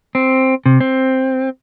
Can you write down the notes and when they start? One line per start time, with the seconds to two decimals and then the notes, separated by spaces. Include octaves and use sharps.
0.15 C4
0.66 C3
0.81 C4